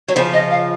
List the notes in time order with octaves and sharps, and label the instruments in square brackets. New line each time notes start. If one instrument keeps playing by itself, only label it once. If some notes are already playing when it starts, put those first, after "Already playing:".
[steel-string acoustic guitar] F#3 [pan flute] C#5
[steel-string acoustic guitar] C#3 F3 [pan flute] C5
[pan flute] D#5
F5